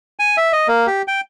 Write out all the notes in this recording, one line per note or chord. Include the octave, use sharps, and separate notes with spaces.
G#5
E5
D#5
A#3
G4
G5